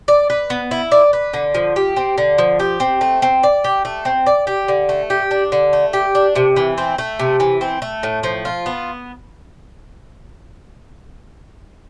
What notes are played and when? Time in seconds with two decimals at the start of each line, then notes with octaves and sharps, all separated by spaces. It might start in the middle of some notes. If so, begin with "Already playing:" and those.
0.08 D5
0.30 B4
0.50 B3
0.71 E4
0.92 D5
1.13 B4
1.34 D3
1.55 F3
1.76 G4
1.97 C4
2.18 D3
2.38 F3
2.60 G4
2.80 C4
3.01 A3
3.22 C4
3.43 D5
3.64 G4
3.85 A3
4.05 C4
4.26 D5
4.47 G4
4.68 D3
4.89 A3
5.10 G4
5.31 D4
5.52 D3
5.73 A3
5.93 G4
6.15 D4
6.36 C3
6.56 E3
6.78 C4
6.98 A3
7.19 C3
7.40 E3
7.61 C4
7.82 A3
8.03 A2
8.23 F3
8.45 F4
8.66 B3